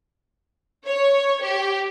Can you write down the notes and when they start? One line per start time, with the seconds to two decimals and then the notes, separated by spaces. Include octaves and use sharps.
0.86 C#5
1.42 G4